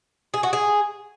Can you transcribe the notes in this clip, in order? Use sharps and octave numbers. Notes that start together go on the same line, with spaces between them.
G#4
F#4
G#4